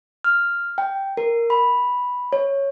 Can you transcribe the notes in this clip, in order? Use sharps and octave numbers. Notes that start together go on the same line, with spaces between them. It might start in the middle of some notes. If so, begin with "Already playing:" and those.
F6
G5
A#4
B5
C#5